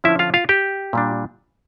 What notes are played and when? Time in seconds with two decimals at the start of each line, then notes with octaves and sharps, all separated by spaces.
0.04 D3 F3 C#4 E4 E5
0.19 F4 F5
0.34 F4 F5
0.49 G4 G5
0.93 A#2 G3 D4